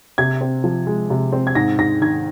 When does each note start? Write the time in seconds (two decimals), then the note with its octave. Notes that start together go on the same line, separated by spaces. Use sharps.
0.18 C3 G#6
0.41 C4
0.64 F3
0.87 G#3
1.10 C3
1.32 C4
1.47 G#6
1.55 G#2 A#6
1.78 G#2 A#6
2.01 D#3 G#6